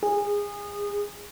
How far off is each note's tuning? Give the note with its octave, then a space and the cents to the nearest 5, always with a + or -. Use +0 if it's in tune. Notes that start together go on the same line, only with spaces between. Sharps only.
G#4 -20